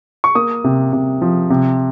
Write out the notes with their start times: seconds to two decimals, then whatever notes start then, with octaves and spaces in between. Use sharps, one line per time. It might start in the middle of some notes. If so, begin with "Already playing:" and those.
0.24 C#6
0.35 A#3 D#6
0.64 C3
0.93 C3
1.22 F3
1.50 C3